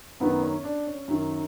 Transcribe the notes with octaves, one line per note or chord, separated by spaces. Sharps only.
F#2 D#3 B3
C#4
D4
C#4
F#2 D#3